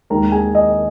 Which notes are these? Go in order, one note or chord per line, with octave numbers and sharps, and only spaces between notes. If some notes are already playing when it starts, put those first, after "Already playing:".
D#2 D#3 G#3 A#4 A#5
G#4 G#5
D#5